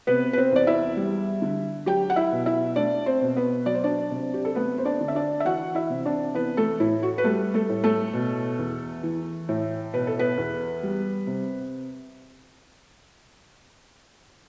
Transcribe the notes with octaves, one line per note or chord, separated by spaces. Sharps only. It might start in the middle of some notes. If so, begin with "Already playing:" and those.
C3 B3 B4
B4
C4 C5
E2 D5
E4 E5
G3
D3
F#3 G4 G5
F#5
E4 E5
B2
E4 E5
A3 D4 D5
C4 C5
B2
B3 B4
F#3 D5
C5
D4 D5
C3
G4
A4
A3 B3 B4
C5
D4 D5
D3
E5
D4 D5
E5
E3 F#4 F#5
E4 E5
C3
D4 D5
E3 B3 B4
A3 A4
A2 E4
F#4
B4
G3 A3 A4
A3 A4
A2
A3 A4
B2
E2
E3
A2
B2 B4
A4
B3 B4
E2
G3
C3